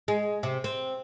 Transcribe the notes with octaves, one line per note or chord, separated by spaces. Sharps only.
G#3
C3
C4